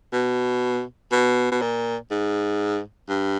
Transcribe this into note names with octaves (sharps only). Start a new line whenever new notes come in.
B2
B2
B2
A#2
G#2
G2